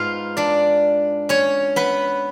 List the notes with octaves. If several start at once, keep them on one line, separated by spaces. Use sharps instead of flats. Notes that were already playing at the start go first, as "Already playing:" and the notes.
Already playing: G#2 G#3 B3 F4 F5
D4 D5
C#4 C#5
B3 B4